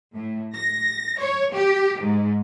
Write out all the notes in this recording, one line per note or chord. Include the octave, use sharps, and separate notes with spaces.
A2
A#6
C#5
G4
G#2